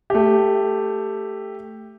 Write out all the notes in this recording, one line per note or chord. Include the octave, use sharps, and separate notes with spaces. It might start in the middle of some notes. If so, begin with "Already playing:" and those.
A3 G4